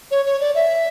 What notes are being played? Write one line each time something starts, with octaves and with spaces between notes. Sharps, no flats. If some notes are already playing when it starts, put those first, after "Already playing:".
C#5
C#5
D5
E5